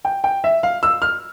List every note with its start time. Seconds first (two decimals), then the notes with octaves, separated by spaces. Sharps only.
0.05 G5
0.24 G5
0.44 E5
0.63 F5
0.83 E6
1.02 F6